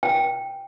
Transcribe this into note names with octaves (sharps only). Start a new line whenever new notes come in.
G5